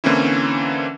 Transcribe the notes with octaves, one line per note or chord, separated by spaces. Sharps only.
D3 E3 A#3 C4 C#4 E4